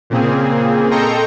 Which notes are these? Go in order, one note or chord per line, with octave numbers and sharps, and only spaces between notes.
A#2 C#3 A#3 C4 G#4
A4 D#5 G5 A#5 C6 C#6